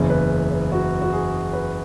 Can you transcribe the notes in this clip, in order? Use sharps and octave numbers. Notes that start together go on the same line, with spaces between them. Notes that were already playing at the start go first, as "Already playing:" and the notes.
Already playing: F#1 E2 C#3
B4
B4
F#4
F#4
G#4
B4